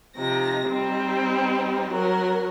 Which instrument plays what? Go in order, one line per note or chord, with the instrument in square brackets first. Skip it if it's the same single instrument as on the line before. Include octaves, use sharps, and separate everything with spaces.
[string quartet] C3 F3 D#4 A#6
G3 C4 D#4
F#3 A#4